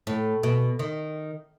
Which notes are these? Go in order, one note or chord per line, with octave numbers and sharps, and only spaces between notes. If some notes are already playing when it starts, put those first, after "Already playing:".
A2
B2
D#3